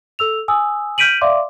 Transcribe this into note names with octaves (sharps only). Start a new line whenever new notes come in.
A4 E6 F7
G#5 D#6 E6
F6 G6 B6 D7 D#7 F#7
D5 E5 F5 C6 D6